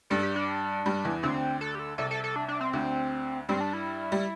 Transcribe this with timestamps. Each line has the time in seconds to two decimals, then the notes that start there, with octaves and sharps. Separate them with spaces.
0.10 G2 G3 A4
0.23 G4
0.36 D4
0.85 G2 G3
1.05 E2 E3
1.23 D2 D3 C4
1.61 A4
1.75 G4
1.79 A4
1.98 C2 C3 A4
2.11 A4
2.24 A4
2.36 D4
2.48 D4
2.61 C4
2.73 D2 D3
3.49 G2 G3 C4
3.61 D4
3.73 E4
4.12 G3